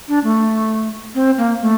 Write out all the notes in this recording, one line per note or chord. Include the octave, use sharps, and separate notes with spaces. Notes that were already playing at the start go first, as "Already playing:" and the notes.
D4
A3
C4
A#3
A3